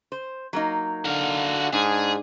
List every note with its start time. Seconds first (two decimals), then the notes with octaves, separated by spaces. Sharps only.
0.12 C5
0.53 F#3 A#3 D#4
1.05 D3 F#4 F5
1.73 G#2 D4 G#4